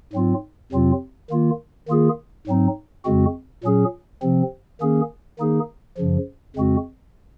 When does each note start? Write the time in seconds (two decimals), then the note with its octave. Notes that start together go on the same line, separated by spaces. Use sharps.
0.13 G#2 F#3 C4 F4
0.72 F2 C3 F#3 C4 F4
1.30 D#3 A#3 F4
1.88 D#3 A#3 F4 G#4
2.47 G#2 F#3 C4 D#4
3.05 F2 C#3 G#3 C4 F#4
3.64 A#2 F#3 C#4 G#4
4.22 C3 F3 C4
4.81 D#3 A#3 C#4 G#4
5.39 D#3 A#3 D#4 G#4
5.98 F#2 C#3 F3
6.56 F2 C#3 G#3 C4 F#4